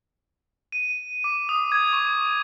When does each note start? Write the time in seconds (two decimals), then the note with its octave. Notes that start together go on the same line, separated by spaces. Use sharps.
0.72 D#7
1.24 D6
1.49 D#6
1.72 G#6
1.93 C#6